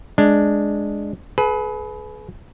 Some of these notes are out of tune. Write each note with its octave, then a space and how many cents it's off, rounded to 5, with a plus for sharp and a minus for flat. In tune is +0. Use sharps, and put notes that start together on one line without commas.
G#3 +0 D4 +0
G#4 +40 B4 +0